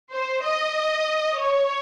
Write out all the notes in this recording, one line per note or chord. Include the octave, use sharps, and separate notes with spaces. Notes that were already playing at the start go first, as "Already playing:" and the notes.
C5
D#5
C#5